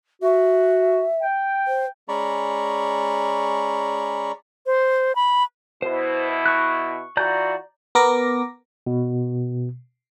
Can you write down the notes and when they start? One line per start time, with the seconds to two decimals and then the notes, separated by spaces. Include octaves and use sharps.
0.22 F#4 E5
1.21 G5
1.67 C5
2.08 G#3 C#4 D5 A#5 B5 C#6
4.66 C5
5.15 B5
5.82 B2 E4 C5
6.46 C#6 F#6
7.17 E3 F4 F#4 D5 A#5 G6
7.95 B3 A#4 D6 A#6
8.87 B2